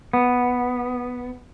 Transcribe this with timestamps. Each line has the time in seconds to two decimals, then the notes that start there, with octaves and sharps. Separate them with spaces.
0.13 B3